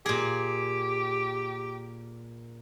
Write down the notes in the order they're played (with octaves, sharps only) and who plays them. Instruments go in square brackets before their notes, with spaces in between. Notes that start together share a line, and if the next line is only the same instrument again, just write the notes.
[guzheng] A#2 G#4 [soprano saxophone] G4